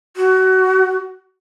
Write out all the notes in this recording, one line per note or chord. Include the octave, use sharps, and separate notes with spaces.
F#4